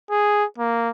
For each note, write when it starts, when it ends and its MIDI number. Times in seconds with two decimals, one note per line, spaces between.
0.11 0.45 68
0.58 0.90 58